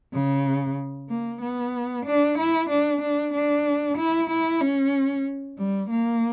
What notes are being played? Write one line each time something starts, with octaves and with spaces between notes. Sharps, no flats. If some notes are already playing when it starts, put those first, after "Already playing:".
C#3
A#3
B3
D4
E4
D4
D4
D4
E4
E4
C#4
G3
A#3